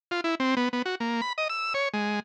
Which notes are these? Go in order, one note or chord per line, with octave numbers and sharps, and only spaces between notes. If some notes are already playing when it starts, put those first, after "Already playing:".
F4
E4
C4
B3
B3
F#4
A#3
B5
D#5
E6
C#5
G#3